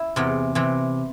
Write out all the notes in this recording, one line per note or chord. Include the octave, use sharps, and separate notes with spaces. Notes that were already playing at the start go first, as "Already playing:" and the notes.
Already playing: E4
E2 C3 E3
C3 E3